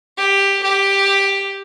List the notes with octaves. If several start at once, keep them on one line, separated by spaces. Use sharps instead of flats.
G4
G4